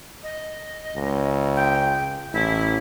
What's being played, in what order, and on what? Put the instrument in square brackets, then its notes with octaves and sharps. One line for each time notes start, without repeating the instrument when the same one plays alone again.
[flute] D#5
[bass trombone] C#2
[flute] G5
[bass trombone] A1 [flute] E4